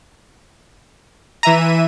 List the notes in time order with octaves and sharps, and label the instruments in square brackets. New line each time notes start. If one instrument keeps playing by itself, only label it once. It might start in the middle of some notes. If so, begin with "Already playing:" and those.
[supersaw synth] E3 E5 D#7 [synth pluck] A#5